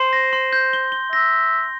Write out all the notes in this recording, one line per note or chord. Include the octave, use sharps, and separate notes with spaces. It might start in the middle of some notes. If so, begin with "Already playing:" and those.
Already playing: C5 C6
A#6
C6
G6
G7
G7
E5 A#6